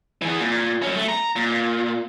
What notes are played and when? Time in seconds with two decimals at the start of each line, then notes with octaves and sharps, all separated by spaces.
0.22 E3 G#4
0.40 A#2
0.82 F#3 C#4
0.96 A3
1.08 A#5
1.36 A#2